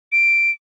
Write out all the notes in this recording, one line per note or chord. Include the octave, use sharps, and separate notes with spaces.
D7